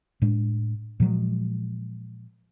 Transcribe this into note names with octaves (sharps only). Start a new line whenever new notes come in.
A2 G#3 D4
A#2 F3 F#3 G#3